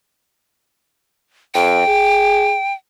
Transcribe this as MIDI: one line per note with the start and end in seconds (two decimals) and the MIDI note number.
1.54 1.83 41
1.54 2.73 79
1.87 2.57 68